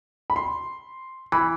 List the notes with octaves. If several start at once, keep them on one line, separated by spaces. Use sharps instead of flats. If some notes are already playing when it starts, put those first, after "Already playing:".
B5
C6
E3 B5